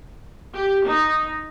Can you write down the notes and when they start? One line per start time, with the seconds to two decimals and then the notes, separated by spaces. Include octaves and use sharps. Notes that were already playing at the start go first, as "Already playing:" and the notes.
0.53 G4
0.86 D#4